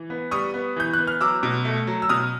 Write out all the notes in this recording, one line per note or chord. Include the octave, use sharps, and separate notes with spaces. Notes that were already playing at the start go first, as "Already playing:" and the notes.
Already playing: E3
B3
G3 C#6 D#6
B3
E3 G6
B3 F#6
F6
F#3 D6 E6
B2
A3
F#3
E6
B2 D#6 F6